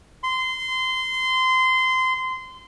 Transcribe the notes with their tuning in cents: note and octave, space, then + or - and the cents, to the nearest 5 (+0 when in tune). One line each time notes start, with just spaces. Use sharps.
C6 -20